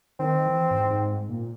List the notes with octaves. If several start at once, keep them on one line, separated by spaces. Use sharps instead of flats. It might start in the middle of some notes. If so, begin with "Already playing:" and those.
D#3 C4
E3
G#2
G#2
A#2